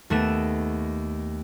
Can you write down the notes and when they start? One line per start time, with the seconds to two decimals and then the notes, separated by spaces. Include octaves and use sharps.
0.10 D#2 A3 B3 E7